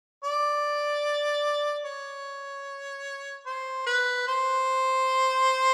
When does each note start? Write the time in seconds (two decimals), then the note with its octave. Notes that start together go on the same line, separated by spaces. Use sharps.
0.24 D5
1.85 C#5
3.46 C5
3.86 B4
4.27 C5